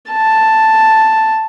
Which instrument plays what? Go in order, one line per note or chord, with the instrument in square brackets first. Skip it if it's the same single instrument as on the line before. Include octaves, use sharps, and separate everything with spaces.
[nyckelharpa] A5